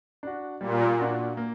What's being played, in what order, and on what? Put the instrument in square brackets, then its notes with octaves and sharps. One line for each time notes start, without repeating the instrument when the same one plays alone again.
[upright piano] D4 F#4
[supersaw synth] A#2 [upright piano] G3
[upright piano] D4 F#4
A#3